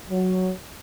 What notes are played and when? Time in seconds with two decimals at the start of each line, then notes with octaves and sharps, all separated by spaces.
0.10 F#3